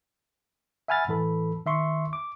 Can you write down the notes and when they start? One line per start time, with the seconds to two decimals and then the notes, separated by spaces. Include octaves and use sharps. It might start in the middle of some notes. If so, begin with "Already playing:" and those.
0.88 E5 F#5 G#5 B5 F6 A6
1.08 A2 E3 A4 B5
1.66 D#3 E5 C6 C#6
2.13 D6